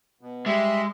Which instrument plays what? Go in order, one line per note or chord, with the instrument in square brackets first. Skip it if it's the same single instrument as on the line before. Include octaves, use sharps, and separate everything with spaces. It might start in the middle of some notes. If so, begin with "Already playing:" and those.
[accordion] B2
[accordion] G3 E5 [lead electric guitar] G#3